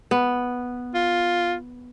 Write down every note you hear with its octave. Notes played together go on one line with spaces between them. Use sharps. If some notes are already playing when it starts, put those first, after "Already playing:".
B3
F4